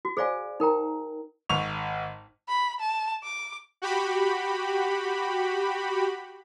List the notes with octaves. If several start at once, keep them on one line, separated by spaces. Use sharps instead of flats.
F#4
G#4 C5 D5 F5 G#5
D#4 A#4 G5 A#5
G#1 C#6 F7
B5
A5
D6
F#4 G4 B5